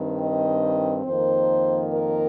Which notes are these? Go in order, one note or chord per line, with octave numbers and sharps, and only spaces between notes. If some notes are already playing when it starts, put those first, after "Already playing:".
Already playing: G2 D#3 C4
D#5
F2 D#3 A#3 C5
A#4